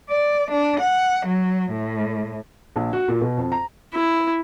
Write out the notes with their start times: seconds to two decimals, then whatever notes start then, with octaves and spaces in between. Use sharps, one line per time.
0.10 D5
0.51 D4
0.80 F#5
1.26 F#3
1.71 A2
2.76 A#1
2.93 F#4
3.08 A#2
3.21 B2
3.37 F2
3.52 A#5
3.94 E4